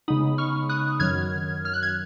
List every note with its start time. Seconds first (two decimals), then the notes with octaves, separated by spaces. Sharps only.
0.08 C#3 G#3 B3 D#4 B5 D#6
0.38 C#6 F6
0.69 D#6 F#6
1.00 F#2 D#3 F#3 F6 G#6
1.65 F6
1.73 F#6
1.83 G#6